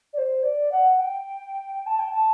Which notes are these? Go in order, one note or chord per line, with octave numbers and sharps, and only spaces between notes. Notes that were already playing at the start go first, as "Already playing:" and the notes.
D5
C5
D5
F#5
G5
A5
G5
A5